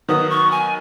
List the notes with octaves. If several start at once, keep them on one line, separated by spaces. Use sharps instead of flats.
D#3 F#3 B3 F#4 D#6
C#6
G#5